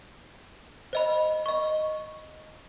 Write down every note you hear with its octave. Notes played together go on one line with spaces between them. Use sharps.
C5 D#5 B5
D#5 C#6